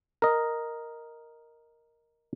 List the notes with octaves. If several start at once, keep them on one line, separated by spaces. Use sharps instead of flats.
A#4 D#5